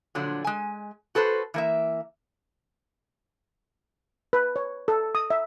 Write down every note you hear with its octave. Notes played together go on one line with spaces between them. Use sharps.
A#2 D3 F3 F#3
G#3 G#5
F#4 A4 B4 C5
E3 A#3 E5
B4
C#5
A4
D#6
E5